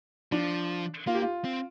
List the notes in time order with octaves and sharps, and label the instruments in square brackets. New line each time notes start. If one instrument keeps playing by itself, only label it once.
[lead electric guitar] F3 [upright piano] D4
[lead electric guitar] A#3 [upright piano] F4
[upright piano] G4
F4
[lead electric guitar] C4